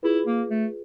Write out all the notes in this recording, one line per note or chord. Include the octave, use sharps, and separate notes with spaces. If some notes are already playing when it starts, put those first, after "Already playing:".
E4 F4 G#4 B4
A#3
A3